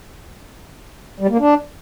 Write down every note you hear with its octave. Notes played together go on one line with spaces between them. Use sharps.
G3
A#3
D4